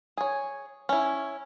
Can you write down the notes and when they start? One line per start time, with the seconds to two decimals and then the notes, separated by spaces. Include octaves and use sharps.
0.17 G#4 C#5
0.89 C#4 E4